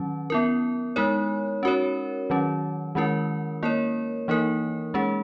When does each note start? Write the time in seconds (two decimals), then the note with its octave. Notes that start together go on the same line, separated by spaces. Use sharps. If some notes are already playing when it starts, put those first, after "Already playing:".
Already playing: D#3 F#3 C#4
0.30 B3 E4 A#4
0.96 G#3 D#4 A#4 C#5
1.63 C#4 F#4 A#4 C#5
2.30 D#3 F#3 C#4
2.95 D#3 G#3 C#4 E4 A#4
3.63 A#3 E4 A#4 C#5
4.28 E3 A#3 D#4 A#4
4.94 G#3 C#4 G#4